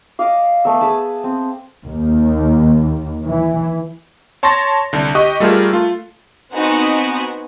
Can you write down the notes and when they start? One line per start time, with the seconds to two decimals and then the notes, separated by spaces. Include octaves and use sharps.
0.19 D#5 F5 D6
0.65 A3 B3 E6
0.81 G#4 B4 A5
1.24 C4
1.85 D#2
3.26 E3
4.43 C#5 A5 C6 C#6 A6 A#6
4.93 C2 D3
5.15 G4 D#5 C#6 D#6 F#6
5.40 G3 A3 F4 G#4 A#4
5.73 A3 F4
6.53 B3 C4 D#4 F#4 F#5 G#5